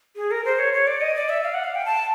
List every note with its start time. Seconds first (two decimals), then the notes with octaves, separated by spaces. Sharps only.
0.16 G#4
0.31 A#4
0.45 C5
0.59 C#5
0.73 C#5
0.87 D5
1.01 D#5
1.16 D5
1.29 E5
1.43 F5
1.54 F#5
1.64 F5
1.75 G5
1.85 A5